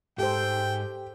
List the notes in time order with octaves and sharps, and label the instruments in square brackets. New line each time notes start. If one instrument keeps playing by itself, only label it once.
[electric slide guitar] G#2 [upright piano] G4 [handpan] A4 C5 [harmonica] G5